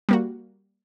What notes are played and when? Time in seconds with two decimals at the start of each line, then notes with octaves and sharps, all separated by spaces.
0.09 G3 A#3 F#4